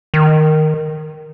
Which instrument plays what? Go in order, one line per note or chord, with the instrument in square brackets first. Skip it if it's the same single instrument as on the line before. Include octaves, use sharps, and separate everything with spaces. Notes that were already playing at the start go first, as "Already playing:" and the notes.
[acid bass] D#3